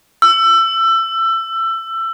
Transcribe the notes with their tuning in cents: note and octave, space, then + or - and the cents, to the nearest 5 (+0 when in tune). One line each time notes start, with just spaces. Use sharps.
E6 +25